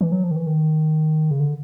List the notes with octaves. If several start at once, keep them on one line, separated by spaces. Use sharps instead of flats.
E3
F#3
F3
D#3
E3
D#3
C#3
D3